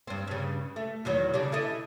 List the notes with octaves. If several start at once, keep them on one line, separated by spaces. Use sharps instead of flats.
G2 C4
G2 C#3
A3
E2 D#3 F#3
C#3 G3 D4
E4 A4 D#5